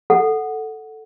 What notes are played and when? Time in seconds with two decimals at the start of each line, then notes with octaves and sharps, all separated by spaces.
0.10 A4 F#5